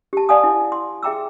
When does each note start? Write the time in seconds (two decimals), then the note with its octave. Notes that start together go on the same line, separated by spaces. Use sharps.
0.13 G4 A5
0.29 D5 F5 F#5 G#5 D#6
0.44 E4
0.72 C6
1.03 G#4 E5 G5 A#5 D6 E6